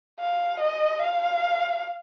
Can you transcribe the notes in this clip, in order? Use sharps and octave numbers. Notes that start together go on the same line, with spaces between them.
F5
D#5
F5